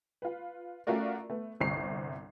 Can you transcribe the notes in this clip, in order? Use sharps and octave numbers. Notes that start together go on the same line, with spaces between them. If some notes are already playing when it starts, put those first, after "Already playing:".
F4 B4
A3 C#4 F4 F#4 A#4 D5
A3 B3
G1 C2 C4 C#6 C7